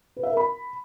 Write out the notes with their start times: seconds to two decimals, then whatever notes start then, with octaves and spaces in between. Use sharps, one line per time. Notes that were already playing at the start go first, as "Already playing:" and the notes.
0.17 B4
0.23 E5
0.30 A#4
0.37 B5